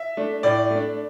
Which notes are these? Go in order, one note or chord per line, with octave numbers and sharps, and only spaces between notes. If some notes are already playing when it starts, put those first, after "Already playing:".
Already playing: E5
A3 D4
A2 D5
A3 D4